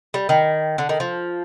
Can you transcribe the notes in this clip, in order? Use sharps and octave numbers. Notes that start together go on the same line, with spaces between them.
G3
D#3
D3
D#3
F3